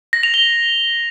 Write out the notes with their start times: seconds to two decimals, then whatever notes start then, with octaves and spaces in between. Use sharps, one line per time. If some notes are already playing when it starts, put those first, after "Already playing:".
0.13 A#6
0.23 F7
0.34 G7